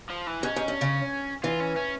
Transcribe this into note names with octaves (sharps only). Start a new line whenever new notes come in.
F3
E3
G#2 C#4
G#2
G2
C#3
E3 F4
C#4
C#4